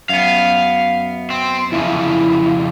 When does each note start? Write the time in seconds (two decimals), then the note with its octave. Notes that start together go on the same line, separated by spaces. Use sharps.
0.09 F#2 B3 F5
1.30 C4
1.72 F2 C#3 E4